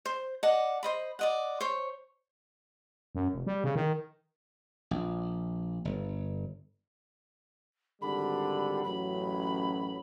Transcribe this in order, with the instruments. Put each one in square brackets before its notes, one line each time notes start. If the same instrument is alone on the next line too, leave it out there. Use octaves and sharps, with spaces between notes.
[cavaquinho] C5
D5 D#5 F#5 A5
C5 D#5 B5
D5 D#5 F#5
C5 C#5
[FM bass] F#2
F1
G3
C#3
D#3
[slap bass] A#1
G1
[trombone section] G#1 D3 G3 [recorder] B5
[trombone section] A1 F#2 F#3 [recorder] B5